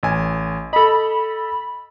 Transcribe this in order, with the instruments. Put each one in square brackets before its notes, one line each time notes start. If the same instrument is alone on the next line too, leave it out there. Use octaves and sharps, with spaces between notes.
[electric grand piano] A1 G#5
[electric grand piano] A4 D#5 [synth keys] B5